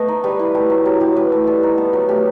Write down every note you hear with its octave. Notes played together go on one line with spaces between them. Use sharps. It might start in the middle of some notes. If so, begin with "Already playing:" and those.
Already playing: A3 B3 D#5
D#4
G3 B4
E4
A3 G4
F#3
F#3 G4
E4 G4
E4 B4
A3
G3 A4
D#4
B3
F#3
A3 G4